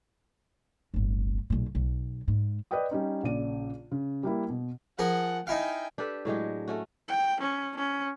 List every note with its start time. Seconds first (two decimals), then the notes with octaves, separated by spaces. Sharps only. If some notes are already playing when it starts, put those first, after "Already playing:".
0.94 D1 G1
1.50 B1 A#2
1.75 B1
2.28 G#2
2.71 B4 D5 D#5 G5 D#6
2.91 G3 C#4 D#4
3.23 A#1 C#3 D5 D#7
3.91 C#3
4.23 G3 A#3 E4
4.50 B2
4.99 F3 G#4 A#4 F#5
5.47 D#4 E4 F5 G5 G#5
5.98 D4 G4 A4 B4
6.25 A2 F#3 G#3 G4
6.68 A3 C#4 F#4
7.08 G5
7.40 C#4
7.76 C#4